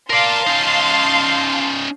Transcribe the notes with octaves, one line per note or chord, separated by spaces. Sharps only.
A#4 D5 F5 A5 C6
C#4 D#4